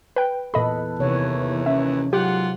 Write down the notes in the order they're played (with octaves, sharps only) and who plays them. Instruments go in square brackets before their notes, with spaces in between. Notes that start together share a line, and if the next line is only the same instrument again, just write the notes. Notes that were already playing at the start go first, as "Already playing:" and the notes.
[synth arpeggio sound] B4 G5
[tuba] E2 [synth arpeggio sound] A#2 D#5 B5 [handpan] A4 B4
[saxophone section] D#2 E3 [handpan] C3 C#5
[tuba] C#4 [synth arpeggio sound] E5
[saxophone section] G#2 F4 F#5 [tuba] F#3 [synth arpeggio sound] G4